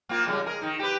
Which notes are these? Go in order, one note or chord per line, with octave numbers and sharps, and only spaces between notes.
A#3 C4 F4
C#3 G3 G#3
G#4 A#4
D#3 D#4
G4 B4